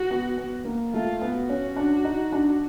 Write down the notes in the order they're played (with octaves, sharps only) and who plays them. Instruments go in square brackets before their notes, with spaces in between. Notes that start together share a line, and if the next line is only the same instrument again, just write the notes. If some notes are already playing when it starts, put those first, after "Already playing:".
Already playing: [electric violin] F#4
[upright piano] B3
B3
A#3
[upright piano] A3 [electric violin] F4
[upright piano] B3
[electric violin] F#4
[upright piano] C#4
D4
D#4
D4